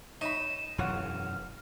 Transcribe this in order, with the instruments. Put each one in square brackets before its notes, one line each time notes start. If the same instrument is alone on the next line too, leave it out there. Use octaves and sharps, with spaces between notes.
[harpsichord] D#4 [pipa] C#5 E5 B5 [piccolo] E7
[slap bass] E1 F#2 E3 [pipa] F4 C#5 F#5 [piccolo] F6